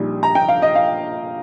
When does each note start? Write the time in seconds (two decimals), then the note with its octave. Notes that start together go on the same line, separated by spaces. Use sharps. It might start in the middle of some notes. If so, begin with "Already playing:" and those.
Already playing: A#1 A#2 G3 D#4
0.23 A#5
0.35 G5
0.48 F5
0.62 D#5
0.75 F5